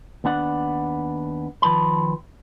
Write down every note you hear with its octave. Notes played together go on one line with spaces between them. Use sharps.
D#2 B3 D4 F#5
D#3 F3 B4 A5 B5